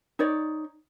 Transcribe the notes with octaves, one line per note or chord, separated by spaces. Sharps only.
D#4 C#5 D5